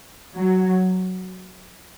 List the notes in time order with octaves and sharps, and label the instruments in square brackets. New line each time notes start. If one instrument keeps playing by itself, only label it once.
[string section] F#3